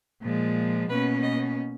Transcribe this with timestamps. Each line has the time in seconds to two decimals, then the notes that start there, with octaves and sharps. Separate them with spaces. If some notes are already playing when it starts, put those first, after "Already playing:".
0.21 A#2 F3 G#3
0.88 B2 A#3 C#4 B4
1.22 D#5